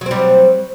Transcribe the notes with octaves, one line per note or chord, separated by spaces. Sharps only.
F#3 G3 C4